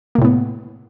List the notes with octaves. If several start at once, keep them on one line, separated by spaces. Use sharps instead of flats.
A2 C3 A#3 B3